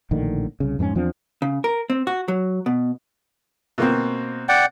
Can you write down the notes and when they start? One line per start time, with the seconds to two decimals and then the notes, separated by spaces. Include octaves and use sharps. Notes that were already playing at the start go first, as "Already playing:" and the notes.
0.11 A#1 A2 D3 D#3
0.60 C2 C#3
0.79 F2 G#2 G#3 C#4
0.95 E2 F3 C4 D4
1.42 C#3
1.64 A#4
1.90 C4
2.07 F#4
2.28 F#3
2.66 B2
3.78 B2 A#3 C4
4.49 D5 F#5 G5